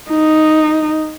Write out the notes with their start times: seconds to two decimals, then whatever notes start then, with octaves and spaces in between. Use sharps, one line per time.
0.10 D#4